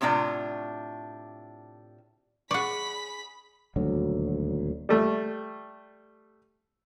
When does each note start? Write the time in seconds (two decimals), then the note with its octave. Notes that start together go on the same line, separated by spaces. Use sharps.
0.01 A2 C3 D4 D#4 F4 A#5
2.51 G#4 D5 F#5 B5 C#6 B6
3.76 D#1 D2 F#3
4.89 G3 A3